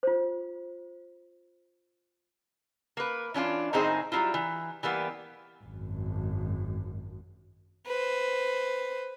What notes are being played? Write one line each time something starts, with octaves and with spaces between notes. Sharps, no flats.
F4 C5
A#3 B4
E3 C#4 D4 F4
A2 D#3 C4 D#4 G#4 C5
F#3 G3 A#3 E4 F4
E3
E3 G3 A#3 B3
G#1 F#2
B4 C5